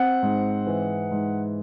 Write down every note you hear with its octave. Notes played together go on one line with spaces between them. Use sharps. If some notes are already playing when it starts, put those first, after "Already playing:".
Already playing: C4 F#5
G#2
E3
G#2